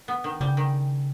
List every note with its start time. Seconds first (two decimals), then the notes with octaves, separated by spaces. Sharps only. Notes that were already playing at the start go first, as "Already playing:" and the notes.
0.08 B3
0.24 D#3
0.40 C#3 G3
0.57 D#3